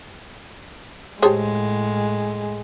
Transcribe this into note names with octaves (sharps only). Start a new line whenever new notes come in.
A2 G#3 G4 G#4 C5 C#5 A5 C6